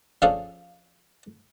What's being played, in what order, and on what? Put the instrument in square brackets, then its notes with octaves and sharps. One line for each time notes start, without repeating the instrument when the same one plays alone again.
[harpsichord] F3 C#4 D4 G#4 A4 F5